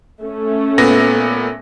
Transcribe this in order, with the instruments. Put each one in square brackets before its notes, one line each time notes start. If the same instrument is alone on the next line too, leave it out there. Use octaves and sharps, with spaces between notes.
[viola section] A3 C#4
[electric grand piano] A#2 B3 A#6